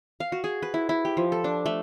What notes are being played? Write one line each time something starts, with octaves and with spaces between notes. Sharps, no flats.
F5
F#4
G#4
B4
E4
E4
G4
F3
A4
D4
A3